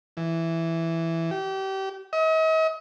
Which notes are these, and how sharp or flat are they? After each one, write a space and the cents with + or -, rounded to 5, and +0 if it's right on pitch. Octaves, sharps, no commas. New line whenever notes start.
E3 +5
G4 -30
D#5 +40